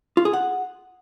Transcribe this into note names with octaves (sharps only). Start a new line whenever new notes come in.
F4
G#4
F#5